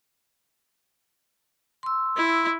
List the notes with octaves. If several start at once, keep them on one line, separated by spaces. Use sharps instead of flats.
C6 E6
E4